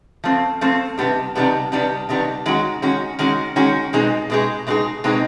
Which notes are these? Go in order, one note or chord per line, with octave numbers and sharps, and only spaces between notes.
F3 A3 C4
F3 A3 C4
C3 D#3 G3 B3 D4
C3 D#3 G3 B3 D4
C3 D#3 G3 B3 D4
C3 D#3 G3 B3 D4
D#3 G#3 C#4 F#4
D#3 G#3 C#4 F#4
D#3 G#3 C#4 F#4
D#3 G#3 C#4 F#4
B2 G#3 C4 D#4 G#4
B2 G#3 C4 D#4 G#4
B2 G#3 C4 D#4 G#4
B2 G#3 C4 D#4 G#4